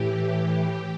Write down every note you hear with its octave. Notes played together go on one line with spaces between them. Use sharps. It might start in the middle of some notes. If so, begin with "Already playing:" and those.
Already playing: A2 E3 G4